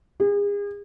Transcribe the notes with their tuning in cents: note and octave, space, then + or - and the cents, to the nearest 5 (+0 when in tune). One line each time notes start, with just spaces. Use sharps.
G#4 -40